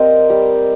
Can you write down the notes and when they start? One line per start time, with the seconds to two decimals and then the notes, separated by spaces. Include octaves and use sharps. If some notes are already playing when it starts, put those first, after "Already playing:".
Already playing: G3 A#3 C4 G4 A#4 C5 D#5
0.30 G3